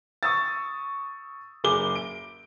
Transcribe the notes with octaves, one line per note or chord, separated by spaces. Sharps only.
C#6 D#6 E6 A6
F#1 G#4 D6 G7
D7